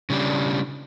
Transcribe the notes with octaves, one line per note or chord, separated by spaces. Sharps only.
C#3 G3 D4